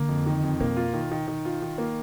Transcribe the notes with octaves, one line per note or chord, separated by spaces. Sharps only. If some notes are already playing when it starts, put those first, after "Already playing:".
Already playing: D3 A#3
F2
D#3
F2
B2 A#3
F4
D#3
D#3
D#3
F4
D#3
A#3